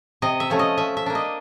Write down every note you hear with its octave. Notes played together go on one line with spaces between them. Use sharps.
C3 D#5
E5
F3 A3 C#4
D#5
F3 E5
E5
A#3 D4
D#5